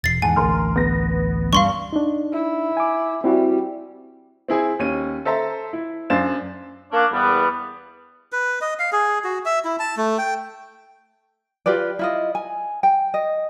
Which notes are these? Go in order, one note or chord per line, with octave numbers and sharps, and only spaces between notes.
E1 A6 C7
E2 G#2 F#5 G#5 A5
A1 D2 A#4 C6 F6
B3 A#6
G2 F5 C6 C#6
D4 D#4
E4
G#5 D6
G3 C4 E4 F#4
C4 E4 G#4
D#2 C#4 D#7
A4 C5 E5 A5 A#5
E4
F#2 D4 C5 F5 A6 E7
A#3 C#4 D4
E2 G3 B3
B4
D#5
F5
G#4
F#4
E5
E4
A5
A3
G5
F4 G4 B4 D5
E4 F4 D#5
G#5
G5
D#5